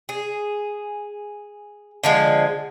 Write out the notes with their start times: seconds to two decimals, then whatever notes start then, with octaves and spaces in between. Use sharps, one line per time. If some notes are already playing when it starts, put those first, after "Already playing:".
0.09 G#4
2.03 D3 F3 G#3